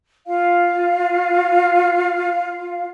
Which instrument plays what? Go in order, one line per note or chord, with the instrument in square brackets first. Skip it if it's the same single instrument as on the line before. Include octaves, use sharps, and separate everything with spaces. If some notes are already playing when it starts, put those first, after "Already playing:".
[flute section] F4 F5